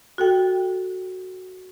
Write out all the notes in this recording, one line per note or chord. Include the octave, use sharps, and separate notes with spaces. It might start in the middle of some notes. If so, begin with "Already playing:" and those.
F#4 A4 G5